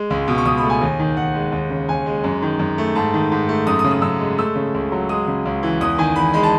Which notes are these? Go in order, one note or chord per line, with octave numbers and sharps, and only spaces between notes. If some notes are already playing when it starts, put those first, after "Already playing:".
Already playing: G#3
C#2
B2
C#6
C#2 D#6
B5
A3
G#5
D#2
D#3
D#2 F#5
G#3
D#2
C#3
D#2 G#5
G#3
F#2
D#3
F#2
A3
G#2 A5
D#3
G#2
A3
F#2 D#6
D#6
C#3
D#6
F#2 E6
G#3
A3 E6
C#3
C#2
F#3
G#3 D#6
C#3
C#2
E3
E2 D#6
D#3 G#5
E2 B5
G#3 B5
A5